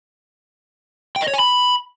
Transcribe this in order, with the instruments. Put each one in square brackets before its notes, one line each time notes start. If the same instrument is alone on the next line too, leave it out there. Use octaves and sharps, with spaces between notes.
[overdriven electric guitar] G5
D#5
C#5
G#5
B5